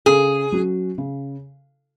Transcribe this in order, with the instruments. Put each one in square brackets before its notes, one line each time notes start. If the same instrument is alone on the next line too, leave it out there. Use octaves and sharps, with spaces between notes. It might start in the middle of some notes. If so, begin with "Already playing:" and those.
[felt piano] C#3 [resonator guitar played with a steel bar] G#4
[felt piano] F#3 C#4 F#4
C#3